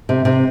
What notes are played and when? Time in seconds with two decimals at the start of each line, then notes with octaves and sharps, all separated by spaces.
0.09 C3
0.25 C3